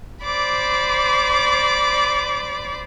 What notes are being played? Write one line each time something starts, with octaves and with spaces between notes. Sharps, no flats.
C5 D5 B5 D6